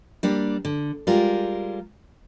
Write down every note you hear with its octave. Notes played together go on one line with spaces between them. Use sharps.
G3 A#3 D4
D3
G3 G#3 F4 A#4